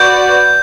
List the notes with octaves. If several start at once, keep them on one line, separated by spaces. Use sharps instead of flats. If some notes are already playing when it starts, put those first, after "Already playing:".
Already playing: F#4 B4 D5 G6